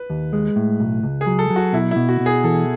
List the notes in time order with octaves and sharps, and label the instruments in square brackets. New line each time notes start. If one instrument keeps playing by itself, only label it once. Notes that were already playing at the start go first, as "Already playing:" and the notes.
Already playing: [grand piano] B4
[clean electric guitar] D#2
G#3
A2
B1
C#2
[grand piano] G#4
[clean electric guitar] F#3
[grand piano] A4
[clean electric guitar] F#3
[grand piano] F#4
[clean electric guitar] B2 [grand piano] E4
[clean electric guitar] B2 [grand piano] E4
[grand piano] F#4
[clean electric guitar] B2
[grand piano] G#4
[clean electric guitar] E3 [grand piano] A4